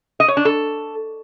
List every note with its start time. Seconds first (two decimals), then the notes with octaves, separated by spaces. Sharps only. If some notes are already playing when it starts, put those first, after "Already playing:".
0.20 D#5
0.28 C#5
0.37 D4
0.45 A4